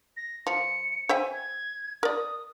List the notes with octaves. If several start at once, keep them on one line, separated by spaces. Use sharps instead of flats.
A#6
F3 C#7
C5 E5 G5 G#5
G#6
A#4 D5 D#6